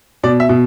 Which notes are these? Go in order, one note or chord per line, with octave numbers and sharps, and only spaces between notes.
B2 D5
E5
B2